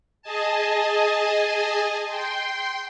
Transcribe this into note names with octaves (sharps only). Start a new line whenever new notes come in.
G#4 D#5 G#5 A5
G5 C6